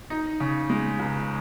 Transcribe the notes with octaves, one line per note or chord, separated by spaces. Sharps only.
D#4
C#3
G#3
C#2